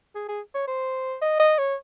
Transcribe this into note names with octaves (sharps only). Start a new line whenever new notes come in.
G#4
G#4
C#5
C5
D#5
D#5
C#5